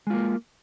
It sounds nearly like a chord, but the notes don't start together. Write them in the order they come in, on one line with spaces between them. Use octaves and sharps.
G#3 F4 A#3